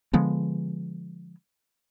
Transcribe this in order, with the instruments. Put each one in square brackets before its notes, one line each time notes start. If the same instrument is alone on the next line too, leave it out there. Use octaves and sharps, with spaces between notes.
[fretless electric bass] D3 F3 G#3 B3